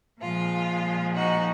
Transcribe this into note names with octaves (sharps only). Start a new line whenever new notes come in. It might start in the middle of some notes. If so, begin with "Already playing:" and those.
A#2 F3 G#3 F4
D#4 F#4